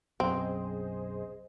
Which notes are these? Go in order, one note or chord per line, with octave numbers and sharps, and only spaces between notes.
B1 F#2 C4 G#4 C5 D#5